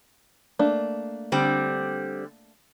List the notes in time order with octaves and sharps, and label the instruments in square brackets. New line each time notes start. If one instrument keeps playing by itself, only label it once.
[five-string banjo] A3 A#3 D4
[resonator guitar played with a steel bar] D3 G3 C4